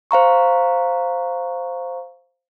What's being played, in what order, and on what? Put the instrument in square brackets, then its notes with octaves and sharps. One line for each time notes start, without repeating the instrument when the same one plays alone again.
[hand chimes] C5 F5 A#5 C#6